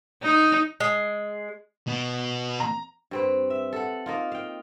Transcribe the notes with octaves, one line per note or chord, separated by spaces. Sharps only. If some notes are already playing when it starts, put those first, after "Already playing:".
D#4
G#3
B2 B3
A#5
G2 C4 B4
E5
A4 F#5
A#3 D#4 F4
F5 G5